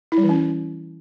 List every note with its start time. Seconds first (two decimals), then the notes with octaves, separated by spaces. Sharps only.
0.12 E4
0.18 G3
0.23 E3
0.29 C#4